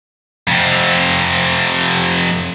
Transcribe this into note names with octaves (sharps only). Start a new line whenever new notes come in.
F2 C3